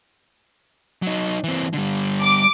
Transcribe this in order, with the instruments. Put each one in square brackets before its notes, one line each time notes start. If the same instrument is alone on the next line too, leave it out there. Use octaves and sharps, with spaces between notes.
[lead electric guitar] F#3 D#4
E3 C4
D3 G3
[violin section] D6